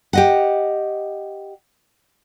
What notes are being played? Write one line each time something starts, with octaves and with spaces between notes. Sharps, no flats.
G4 D#5 F#5